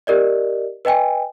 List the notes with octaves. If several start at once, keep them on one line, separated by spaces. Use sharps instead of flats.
G4 A#4 D5 D#5
B4 D#5 G5 G#5